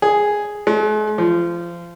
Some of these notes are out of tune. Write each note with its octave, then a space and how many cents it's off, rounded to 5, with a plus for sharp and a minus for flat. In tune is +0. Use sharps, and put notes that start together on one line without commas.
G#4 +0
G#3 +45
F3 -25